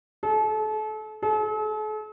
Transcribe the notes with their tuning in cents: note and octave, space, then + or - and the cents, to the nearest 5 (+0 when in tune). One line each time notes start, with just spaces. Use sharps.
A4 -35
A4 -45